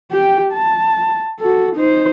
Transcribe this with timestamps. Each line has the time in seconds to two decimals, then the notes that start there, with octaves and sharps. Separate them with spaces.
0.11 G4 G5
0.52 A5
1.40 F#4 A4
1.76 D#4 C5